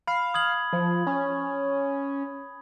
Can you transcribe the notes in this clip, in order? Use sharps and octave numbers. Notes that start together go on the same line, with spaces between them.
F5 B5
D#6 G#6 F#7
F3
C#4